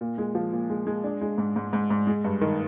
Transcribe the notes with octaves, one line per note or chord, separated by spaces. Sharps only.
A#2
G#3
F3
A#2
G#3
G#3
D4
G#3
G#2
G#2
G#2
G#2
G#3
G2
D#3